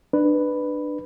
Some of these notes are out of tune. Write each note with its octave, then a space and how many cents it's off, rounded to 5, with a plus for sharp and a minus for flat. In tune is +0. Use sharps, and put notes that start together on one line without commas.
D4 +20 B4 +0